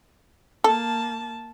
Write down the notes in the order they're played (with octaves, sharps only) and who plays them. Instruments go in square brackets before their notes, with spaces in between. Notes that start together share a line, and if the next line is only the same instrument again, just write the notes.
[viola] A#3 A5 [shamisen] A4